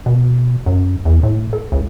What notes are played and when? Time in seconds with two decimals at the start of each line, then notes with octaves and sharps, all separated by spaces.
0.06 B2
0.66 F#2
1.05 E2
1.23 A2
1.53 A4
1.72 C#2